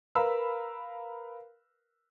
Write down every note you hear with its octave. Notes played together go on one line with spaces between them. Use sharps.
A#4 B4 F5 B5 E6